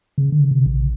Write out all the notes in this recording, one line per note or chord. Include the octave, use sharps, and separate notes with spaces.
C#3
D3
C3
A#1